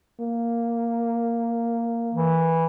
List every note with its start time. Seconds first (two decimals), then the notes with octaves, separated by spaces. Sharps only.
0.21 A#3
2.14 E3